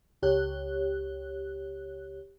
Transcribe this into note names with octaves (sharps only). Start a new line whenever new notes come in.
C#2 G4 C#5 F#6